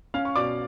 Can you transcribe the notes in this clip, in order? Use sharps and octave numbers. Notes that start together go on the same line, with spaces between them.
C#4 F5 F6
C#6
B2 D5 D6